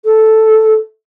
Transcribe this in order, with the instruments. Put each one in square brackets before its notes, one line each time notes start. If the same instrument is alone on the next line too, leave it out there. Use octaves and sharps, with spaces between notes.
[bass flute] A4